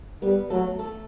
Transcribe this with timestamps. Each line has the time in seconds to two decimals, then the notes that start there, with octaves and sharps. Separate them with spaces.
0.22 G3 B3 B4
0.50 F#3 A3 A4
0.79 A3 A4